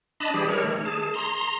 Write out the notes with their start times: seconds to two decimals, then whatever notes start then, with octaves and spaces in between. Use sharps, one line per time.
0.20 D4 D#5 A5 B5
0.34 E3 G3 G4 G#4
0.48 A#4 C#5
0.64 D#3 A3
0.85 G#4 A5
1.14 A#5 C6